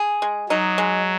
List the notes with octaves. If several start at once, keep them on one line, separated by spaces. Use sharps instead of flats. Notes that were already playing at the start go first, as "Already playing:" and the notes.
Already playing: G#4
G#3
F#3 D#4
G#3